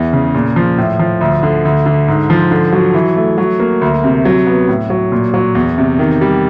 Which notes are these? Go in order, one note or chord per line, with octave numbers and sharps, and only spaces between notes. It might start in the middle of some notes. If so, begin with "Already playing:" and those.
Already playing: E2 E3
C#3
A#2
F3
A2
F3
D2
D3
D2
D3
G#2
F3
D3
F#3
E3
A3
F#3
A#3
D2
C3
F#3
B3
A2
F#3
A#2
F#3
E2
C3
D#3
G3